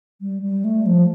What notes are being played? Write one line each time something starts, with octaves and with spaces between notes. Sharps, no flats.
G3
G3
A3
F3